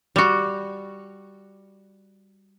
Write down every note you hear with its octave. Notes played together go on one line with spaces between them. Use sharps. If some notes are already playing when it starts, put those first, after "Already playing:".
G3 F#4